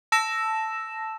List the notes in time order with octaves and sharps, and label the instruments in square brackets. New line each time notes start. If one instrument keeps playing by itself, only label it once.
[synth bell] A5 E6 A#6 E7